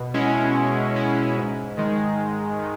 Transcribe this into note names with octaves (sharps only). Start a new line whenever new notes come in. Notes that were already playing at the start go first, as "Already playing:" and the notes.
Already playing: B2
G#3 C#4 E4
B2
G#3 C#4 E4
G#2
D#3 G#3
G#2
D#3